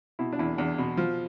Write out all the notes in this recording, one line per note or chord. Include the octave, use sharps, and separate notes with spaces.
B2 E4
D4
E2 E4
E2 D4
B2
F3